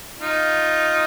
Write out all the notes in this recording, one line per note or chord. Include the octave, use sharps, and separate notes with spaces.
D#4 F4